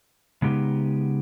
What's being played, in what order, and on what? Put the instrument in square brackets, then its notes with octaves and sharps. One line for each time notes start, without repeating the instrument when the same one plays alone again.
[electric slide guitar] C#3 G#3 B3 D#4 G4